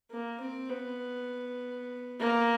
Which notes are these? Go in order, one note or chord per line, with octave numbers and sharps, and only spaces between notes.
A#3
C4
B3
A#3